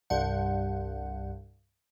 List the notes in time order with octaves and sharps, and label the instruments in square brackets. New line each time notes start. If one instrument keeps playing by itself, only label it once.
[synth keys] C2 G2 F#5